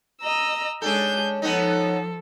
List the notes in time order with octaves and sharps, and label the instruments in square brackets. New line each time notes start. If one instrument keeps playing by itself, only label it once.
[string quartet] D#5 A#5 E6
[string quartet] G#3 G#4 G6 [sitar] C#4 D4 A4
[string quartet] F3 A4 [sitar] B3 C#4 D#4